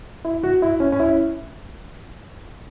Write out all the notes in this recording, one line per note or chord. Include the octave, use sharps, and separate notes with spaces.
E4
F#4
E4
C#4
C#4
E4